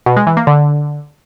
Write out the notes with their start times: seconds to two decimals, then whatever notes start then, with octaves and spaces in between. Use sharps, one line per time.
0.06 B2
0.17 G#3
0.27 E3
0.37 A#3
0.47 D3